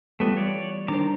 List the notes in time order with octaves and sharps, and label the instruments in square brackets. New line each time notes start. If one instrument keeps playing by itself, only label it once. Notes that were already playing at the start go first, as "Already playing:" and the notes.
[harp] E3 G3 F4 [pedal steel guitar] A3 B3
[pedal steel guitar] C#5 D5
[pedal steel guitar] D#3 A#5 D6 [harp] D4 C5